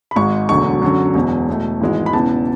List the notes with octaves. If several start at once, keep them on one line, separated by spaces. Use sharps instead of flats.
B5
G#1 G#2 G#3 C#6
E1 D2 D3 F#3 C#6
F#2 D3 F#3
E1 E2 B2
E2 B2 A3
G#1 G#2 E3 G#3
B5
E1 E2 C#3 E3 A5